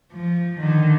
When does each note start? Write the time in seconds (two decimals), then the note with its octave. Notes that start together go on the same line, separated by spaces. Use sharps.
0.13 F3
0.61 D3 D#3